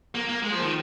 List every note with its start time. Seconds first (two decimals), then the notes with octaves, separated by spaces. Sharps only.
0.15 A#3
0.29 A#3
0.43 G#3
0.52 F3
0.62 D#3